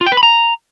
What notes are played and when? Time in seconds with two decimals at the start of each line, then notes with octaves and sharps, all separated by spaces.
0.01 F4
0.06 G5
0.12 B4
0.17 B5
0.23 A#5